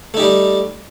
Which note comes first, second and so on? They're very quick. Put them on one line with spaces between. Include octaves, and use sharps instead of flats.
A3 D#4 G4 G3